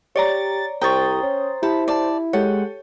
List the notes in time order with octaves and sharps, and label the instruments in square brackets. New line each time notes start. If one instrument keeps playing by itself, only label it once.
[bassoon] G4 [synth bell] C#5 D5 A#5 [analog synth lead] A6
[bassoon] C2 [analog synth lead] C5 [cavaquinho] G5 C#6 [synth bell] A#5 D#6 A6
[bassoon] C#4
[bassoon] E4 [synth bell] G4 [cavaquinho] A5 B5
[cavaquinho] D5 A5
[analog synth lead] G#3 [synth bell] G4 A4 C#5 [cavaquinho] F#5